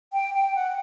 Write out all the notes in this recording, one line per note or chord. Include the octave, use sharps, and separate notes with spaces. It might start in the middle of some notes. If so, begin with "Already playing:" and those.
G5
G5
F#5